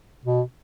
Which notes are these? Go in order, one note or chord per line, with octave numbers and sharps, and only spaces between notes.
B2